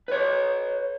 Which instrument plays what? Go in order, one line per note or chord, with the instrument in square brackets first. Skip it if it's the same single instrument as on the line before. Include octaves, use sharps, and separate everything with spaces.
[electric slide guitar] B4 C#5